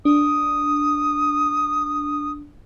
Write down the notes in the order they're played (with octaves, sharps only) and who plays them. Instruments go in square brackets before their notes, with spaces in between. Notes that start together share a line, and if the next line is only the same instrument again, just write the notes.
[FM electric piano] D4 [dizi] D#6